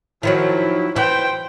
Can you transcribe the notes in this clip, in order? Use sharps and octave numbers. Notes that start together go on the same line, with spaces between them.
D#3 F3 F#3 E4
E3 E4 C5 G5